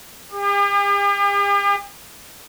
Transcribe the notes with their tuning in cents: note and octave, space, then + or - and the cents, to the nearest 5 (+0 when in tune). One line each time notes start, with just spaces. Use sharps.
G4 +45